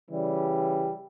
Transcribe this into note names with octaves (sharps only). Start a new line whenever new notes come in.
C#3 E3 G3